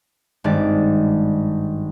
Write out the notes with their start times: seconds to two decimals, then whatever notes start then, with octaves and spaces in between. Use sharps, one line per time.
0.44 G#1 G2 G#3 D5